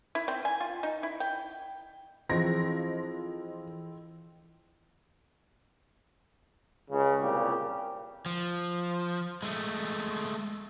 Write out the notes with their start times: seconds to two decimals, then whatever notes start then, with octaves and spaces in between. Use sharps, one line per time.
0.15 E4
0.28 C4
0.45 G#5
0.60 F4
0.83 D#4
1.03 E4
1.20 G5
2.29 E3 F3 C4 E4 G#4 D#5 C6 A#6
6.90 C#2 C#3
7.20 C2 A#2 C#3 G4
8.26 F3
9.43 G#3 A3